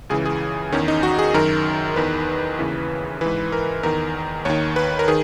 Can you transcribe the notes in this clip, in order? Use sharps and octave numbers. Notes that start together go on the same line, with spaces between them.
C#2 C#3 E3 G#4
G#4
E2 D#3 C#4
D#4
F#4
G#4
F#2 D#3 A#4
E2 D#3 B4
D#2 C#3 E3 B4
G#2 E3 B4
A#4
E2 D#3 A#4
D#2 D#3 C#5
B4
A#4
D#3 G#4